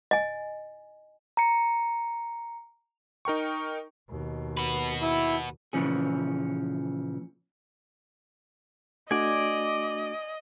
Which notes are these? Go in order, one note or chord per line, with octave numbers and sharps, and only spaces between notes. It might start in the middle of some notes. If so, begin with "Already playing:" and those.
D#5 G#5
A#5 C#7
D#4 A#4 G5 C#6
D#2 B2
F#4 B4
E4
A#2 C#3 E3 F3 C#4 G#4
A3 D4 F#4 D5 D#5 G#5 D6